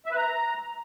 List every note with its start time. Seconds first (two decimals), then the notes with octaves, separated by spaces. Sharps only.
0.06 E5
0.11 B4
0.17 A#5